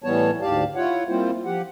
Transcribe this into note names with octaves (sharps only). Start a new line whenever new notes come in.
A2 E3 G3 B3 C#5 A5
D2 G#2 G4 D5 F5 A5
E4 F4 C#5 F#5
G3 A#3 C4 E4 F4 C5
F3 G4 F#5